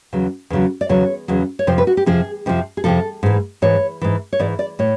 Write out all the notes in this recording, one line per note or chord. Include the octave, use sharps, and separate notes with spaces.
E2 C#3 F#3
E2 C#3 F#3
D5
E2 C#3 F#3 C#5
E2 C#3 F#3
C#5
F2 C3 F3 C5
B4
F#4
G4
F2 C3 F3 G#4
F2 C3 F3
G#4
F2 C3 F3 A4
G#2 E3
G#2 E3 C#5
G#2 E3
C#5
G#2 E3 D5
D5
A2 C#5